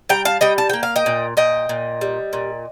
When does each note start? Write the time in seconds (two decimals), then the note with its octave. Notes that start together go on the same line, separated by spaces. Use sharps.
0.09 G3 G5 A#5
0.25 F5 A5
0.41 G3 D#5 G5
0.58 A5
0.70 A#3 G5
0.83 F5
0.96 D#5 G5
1.06 A#2
1.37 A#2 D#5 G5
1.69 A#2
2.01 G3
2.33 A#2